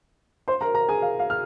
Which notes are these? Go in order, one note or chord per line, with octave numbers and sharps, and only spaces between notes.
C5 C6
A#4 A#5
A#4 A#5
G#4 G#5
F5
F5
F6